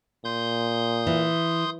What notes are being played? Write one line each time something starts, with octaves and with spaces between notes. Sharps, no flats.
A#2 C6 D#6 G6
E3